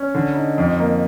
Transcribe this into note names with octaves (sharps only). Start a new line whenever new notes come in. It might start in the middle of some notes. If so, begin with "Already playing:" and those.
Already playing: C#4
D3
D#4
F2
A#3